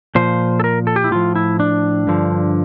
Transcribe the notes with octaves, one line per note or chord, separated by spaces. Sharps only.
A#2 F3 C5
A4
A#4
A4
G4
E4
A2 F3 F4
E4
D4
G2 D3 F3